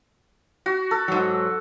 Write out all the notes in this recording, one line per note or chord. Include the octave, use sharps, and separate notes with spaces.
F#4
A4
G#2 F#3